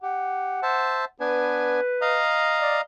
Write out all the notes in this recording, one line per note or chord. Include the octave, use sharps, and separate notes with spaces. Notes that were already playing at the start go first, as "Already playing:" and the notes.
G4 F#5
C5 E5 A5
B3 D4 B4 G#5
D#5 F5 A#5
D5